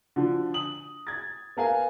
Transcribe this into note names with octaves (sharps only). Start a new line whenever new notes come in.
D3 F3
D#6 F#7
G#6 A6
B3 A#4 F5 G#5